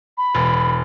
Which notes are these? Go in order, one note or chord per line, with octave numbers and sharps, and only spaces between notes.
B5
E1